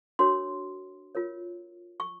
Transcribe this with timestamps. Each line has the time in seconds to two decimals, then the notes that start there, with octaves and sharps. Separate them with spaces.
0.19 D4 F#4 A#4 C#5 C6
1.15 F4 A#4 C#5
2.00 C#6